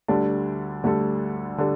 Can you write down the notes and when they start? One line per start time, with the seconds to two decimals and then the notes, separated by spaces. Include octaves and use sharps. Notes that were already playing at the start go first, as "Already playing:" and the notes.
0.08 D2 D3 G3 D4 A4
0.84 D2 D3 G3 D4 A4
1.58 D3 G3 D4 A4